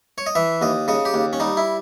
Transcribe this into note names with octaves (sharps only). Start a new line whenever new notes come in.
C#5
D#5
E3 E5
D#2 D#5
C#3 D#5
G4
D#2
C#4
G3 D#4
E4